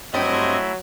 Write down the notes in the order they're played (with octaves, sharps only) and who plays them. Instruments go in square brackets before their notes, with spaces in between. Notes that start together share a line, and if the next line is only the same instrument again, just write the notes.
[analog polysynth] G2 C4 G#6 [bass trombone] F#3 [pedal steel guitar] A3 E4 [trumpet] D#5